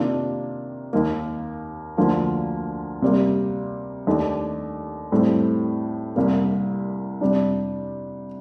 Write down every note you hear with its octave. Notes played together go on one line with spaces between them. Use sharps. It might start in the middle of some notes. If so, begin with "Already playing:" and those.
Already playing: C3 D#3 A#3 D4 F4
D#2 D#3 A#3
D2 D3 F3 A#3 F4
C3 G3 A#3
D#2 D#3 A3 D4 G4
A2 G3 C4
C2 C3 G3 A#3
C3 G3 D4